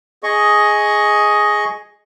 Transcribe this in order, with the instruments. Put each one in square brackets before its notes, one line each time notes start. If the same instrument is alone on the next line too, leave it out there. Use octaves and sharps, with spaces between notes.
[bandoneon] G#4 D#5 C#6